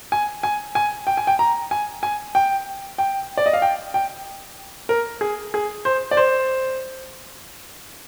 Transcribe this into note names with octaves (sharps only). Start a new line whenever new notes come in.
G#5
G#5
G#5
G5
G#5
G5
A#5
G#5
G#5
G5
G5
D5
D#5
F5
G5
G5
A#4
G#4
G#4
C5
D5
C5